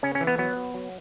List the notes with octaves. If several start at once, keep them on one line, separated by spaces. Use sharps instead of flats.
C#3 C#4
C#4
E3
B3
F#3 B3
F#3
F#3